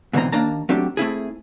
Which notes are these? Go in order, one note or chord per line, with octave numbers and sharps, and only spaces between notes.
G#2 B2 D3 E3 C4 A#5
D#2 A#3 D4 A5 A#5
F#3 A3 C4 D4 G4
A3 C4 E4 G#4